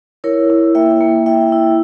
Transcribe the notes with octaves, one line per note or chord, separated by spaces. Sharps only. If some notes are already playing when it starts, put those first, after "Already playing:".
E4 A#4 C#5
E4
A#3 E5 G5
A#3
E4 E5 G5
E4